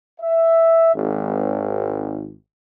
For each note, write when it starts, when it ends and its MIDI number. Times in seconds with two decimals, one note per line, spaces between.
0.21 0.95 76
0.95 2.35 32